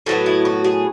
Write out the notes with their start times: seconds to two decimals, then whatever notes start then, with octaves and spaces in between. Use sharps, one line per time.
0.06 A2 F#3 B3 F#4
0.26 E4
0.45 F#4
0.64 G#4